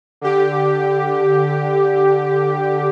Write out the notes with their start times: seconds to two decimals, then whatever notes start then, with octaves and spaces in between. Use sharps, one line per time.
0.21 D3 G4